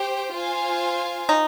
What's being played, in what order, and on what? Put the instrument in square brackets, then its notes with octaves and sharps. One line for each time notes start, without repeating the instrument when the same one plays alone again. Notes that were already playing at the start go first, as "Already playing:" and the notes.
Already playing: [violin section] G4 C5 G5
F4 C5 F5 G#5
[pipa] D#4